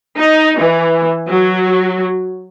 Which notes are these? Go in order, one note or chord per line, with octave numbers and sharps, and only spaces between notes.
D#4
E3
F#3